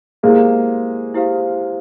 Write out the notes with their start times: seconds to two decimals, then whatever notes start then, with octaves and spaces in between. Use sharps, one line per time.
0.23 G#3 A#3 E4 G4 C5 F5
1.14 E4 G4 C5 F5